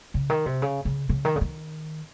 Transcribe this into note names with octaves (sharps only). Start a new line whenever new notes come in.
C#3
D#3
C3
C#3
C#3
C#3
D#3
C#3
D#3